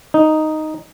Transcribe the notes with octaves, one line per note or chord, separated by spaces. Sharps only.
D#4